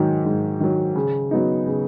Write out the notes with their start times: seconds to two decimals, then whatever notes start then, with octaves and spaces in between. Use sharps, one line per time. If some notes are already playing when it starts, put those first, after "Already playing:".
Already playing: G#2 D#3 F#3
0.25 G#2
0.60 D#3 F#3
0.95 C#3
1.31 F#3 B3 D#4
1.66 C#3